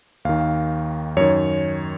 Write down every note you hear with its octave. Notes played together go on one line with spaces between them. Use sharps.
D#2 D#3 F5
F#2 D#3 C#5